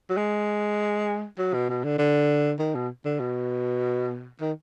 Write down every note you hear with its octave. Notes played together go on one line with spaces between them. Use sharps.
F#3
G#3
F#3
B2
B2
D3
D3
D#3
B2
D3
B2
D#3